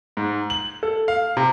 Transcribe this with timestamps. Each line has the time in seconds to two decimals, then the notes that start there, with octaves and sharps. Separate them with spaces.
0.17 G#2
0.50 F#7
0.83 A4
1.08 F5
1.37 C3